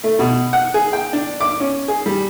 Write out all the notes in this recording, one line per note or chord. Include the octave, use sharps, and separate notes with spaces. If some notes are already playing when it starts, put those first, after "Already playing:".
A3
B2
F#5
G#4
G5
D4
D6
C#4
G#4
G3